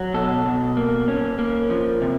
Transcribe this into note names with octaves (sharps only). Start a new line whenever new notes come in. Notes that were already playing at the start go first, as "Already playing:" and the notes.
Already playing: F#3
B2 A4
B2
A#3
C#4
A#3
F3
C3